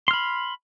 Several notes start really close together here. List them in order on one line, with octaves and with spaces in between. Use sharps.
C6 F6 B5